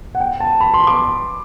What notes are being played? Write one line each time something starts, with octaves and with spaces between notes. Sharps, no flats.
F#5
G5
A5
B5
C6
D6